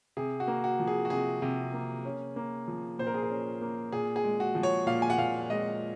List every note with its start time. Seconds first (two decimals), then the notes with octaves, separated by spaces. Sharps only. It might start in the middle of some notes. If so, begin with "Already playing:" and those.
0.17 C3 G#4
0.40 F#4
0.48 A#3
0.64 F#4
0.79 F3
0.87 G#4
1.05 F#4
1.10 C3 G#4
1.42 C3
1.73 A#3
2.05 C#4
2.36 A#3
2.68 F3
2.99 A#2 C5
3.07 A#4
3.15 G#4
3.23 A#4
3.30 C#4
3.62 A#3
3.92 A#2 G#4
4.16 G#4
4.24 G#3
4.40 F#4
4.55 F3
4.63 C#5
4.87 A#2 F5
5.02 G#5
5.10 F#5
5.18 A#2 F5
5.50 G#3 D#5